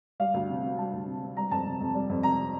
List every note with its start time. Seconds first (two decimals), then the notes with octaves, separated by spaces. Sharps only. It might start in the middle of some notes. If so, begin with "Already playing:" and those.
0.20 G3 F5
0.34 D2
0.49 C3
0.63 C4
0.78 G3 A5
0.93 D2
1.07 C3
1.22 C4
1.37 G3 A#5
1.51 F2 A5
1.66 C3
1.80 F2
1.95 G3
2.09 F2
2.23 C3 A#5